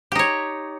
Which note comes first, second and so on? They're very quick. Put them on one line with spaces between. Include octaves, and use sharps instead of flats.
G4 D#4 C#5